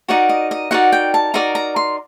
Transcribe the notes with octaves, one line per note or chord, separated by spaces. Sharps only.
D#4 F#4 A#4 D5 F#5
D#5
D#5
D#4 F#4 A#4 D5 F#5
G5
A5
D#4 F#4 A#4 D5 A#5
A#5
C6